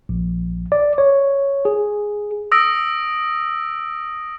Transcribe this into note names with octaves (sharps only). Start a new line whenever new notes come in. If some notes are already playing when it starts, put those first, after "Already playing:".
A#1
D5
C#5
G#4
D#6 E6 A#6 D7